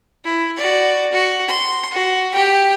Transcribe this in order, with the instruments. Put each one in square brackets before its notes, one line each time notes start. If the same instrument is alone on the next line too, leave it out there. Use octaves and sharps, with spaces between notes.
[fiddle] E4
F#4 D5
F#4
C6
F#4
G4 G5